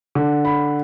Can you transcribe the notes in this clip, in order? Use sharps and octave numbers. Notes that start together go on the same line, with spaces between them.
D3
B5